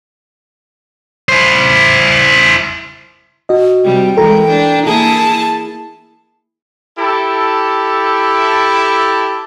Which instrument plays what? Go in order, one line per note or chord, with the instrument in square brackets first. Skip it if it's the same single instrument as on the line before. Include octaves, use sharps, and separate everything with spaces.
[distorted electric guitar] E4 C5
[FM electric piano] F#4 D#5
[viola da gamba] C3 G3 [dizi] G5
[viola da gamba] E3 G#3 [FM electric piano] A4 A#4 A#5
[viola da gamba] D4
[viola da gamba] A#3 E4 G#4 [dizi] A5
[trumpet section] E4 G4 A4 A5